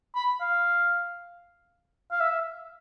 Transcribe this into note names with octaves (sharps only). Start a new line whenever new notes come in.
B5
F5
F5
E5